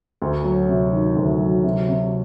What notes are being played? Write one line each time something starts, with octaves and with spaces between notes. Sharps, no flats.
D2
F#3
C3
D#3
D2
F#3
C3
C3